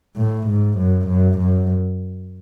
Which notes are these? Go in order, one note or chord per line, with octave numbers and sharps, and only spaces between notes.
A2
G#2
F#2
F#2
F#2